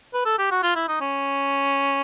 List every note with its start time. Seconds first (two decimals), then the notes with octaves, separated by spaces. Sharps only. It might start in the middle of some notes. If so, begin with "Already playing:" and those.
0.14 B4
0.25 A4
0.38 G4
0.51 F#4
0.63 F4
0.76 E4
0.88 D#4
1.01 C#4